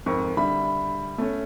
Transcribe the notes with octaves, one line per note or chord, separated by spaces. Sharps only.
F2 G#2 A#4 C#6
D3 G3 E5 B5
A3 C#4